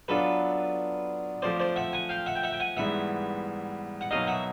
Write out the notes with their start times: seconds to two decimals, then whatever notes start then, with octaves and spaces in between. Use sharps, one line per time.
0.08 F#3 B3 D4 F4 A4 B4
1.42 F3 A3 C4 C5 D5
1.60 C5 D5
1.76 E5 F#5
1.93 F#5 G#5
2.09 F5 G5
2.26 E5 F#5
2.35 G5
2.43 E5 F#5
2.53 G5
2.60 F#5 G#5
2.77 G#2 E3 G3 B3 E5 F#5
4.01 F#5
4.11 B2 F#3 A#3 D#4 D#5 F5
4.27 E5 F#5